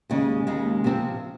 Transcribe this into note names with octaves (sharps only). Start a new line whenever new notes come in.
D#2 C#3 G#3
D#2 C#3 G#3
C3 F3 C4